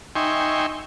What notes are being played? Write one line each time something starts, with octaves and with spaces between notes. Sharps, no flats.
D#4 E5 G5 G#5 C6 C#6